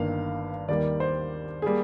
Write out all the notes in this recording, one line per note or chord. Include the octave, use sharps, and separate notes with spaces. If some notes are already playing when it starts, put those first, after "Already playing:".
Already playing: G1 G2 D#3 A#3 F5
D#2 D#3 G3 A#3 D5
C5
G3 A#3 G#4